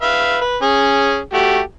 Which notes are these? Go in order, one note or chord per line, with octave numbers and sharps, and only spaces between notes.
B4 E5 F5
B4
C#4 G#4
A3 F#4 G4